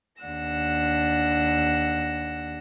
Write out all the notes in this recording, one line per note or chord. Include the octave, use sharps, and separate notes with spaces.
D#2 D4 F#5 E6 A#6